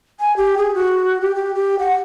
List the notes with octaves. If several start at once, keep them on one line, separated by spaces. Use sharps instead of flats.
G#5
G4
G#4
F#4
G4
G4
G4
F#5